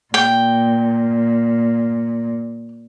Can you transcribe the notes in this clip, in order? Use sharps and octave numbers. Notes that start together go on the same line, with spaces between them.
A#2 G5